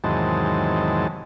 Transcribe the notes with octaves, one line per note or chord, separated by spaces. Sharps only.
E2 G#2 C3 D#3 F#3 A5